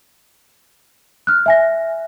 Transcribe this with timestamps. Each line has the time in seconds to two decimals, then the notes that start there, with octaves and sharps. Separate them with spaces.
1.27 F6 F#6
1.46 E5 G#5 A#6